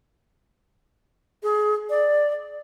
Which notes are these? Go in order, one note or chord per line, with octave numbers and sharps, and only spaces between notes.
G#4
D5